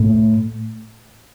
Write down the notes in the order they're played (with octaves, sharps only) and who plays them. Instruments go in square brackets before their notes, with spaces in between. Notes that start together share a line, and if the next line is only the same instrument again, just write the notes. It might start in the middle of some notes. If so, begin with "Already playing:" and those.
Already playing: [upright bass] A2